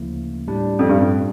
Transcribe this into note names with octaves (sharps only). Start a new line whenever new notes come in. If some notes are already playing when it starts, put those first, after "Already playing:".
Already playing: D2 C#3 F3 A#3 E4
A2 G3 D4
F2
G2
F2